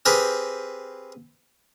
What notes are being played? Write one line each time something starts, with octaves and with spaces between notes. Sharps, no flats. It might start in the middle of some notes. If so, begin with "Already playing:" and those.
C4 G4 G#4 A#4 B4